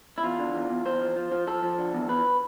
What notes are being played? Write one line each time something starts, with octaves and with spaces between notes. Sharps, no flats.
E4
E2 F4
D3
E2
E2
E2 C5
F3
F3
F3
F3 A4
F3
D3
E2
E2 B4